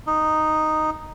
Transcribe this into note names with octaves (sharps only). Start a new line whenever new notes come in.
D#4